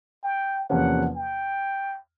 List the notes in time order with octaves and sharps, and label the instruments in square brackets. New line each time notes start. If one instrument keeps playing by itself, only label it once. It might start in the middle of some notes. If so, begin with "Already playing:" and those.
[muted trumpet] G5
[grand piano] E2 C3 F3 A#3 C#4 [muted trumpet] F#5
[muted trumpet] G5